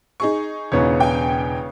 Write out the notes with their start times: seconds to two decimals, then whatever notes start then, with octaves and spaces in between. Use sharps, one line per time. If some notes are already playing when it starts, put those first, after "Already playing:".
0.20 D#4 G#4 C#6
0.72 E1 E2 C#3 B3 C#5
1.00 G5 G#5